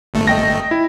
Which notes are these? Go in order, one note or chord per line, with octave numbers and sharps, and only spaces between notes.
G1 A3
D#5 G5 A#6
E4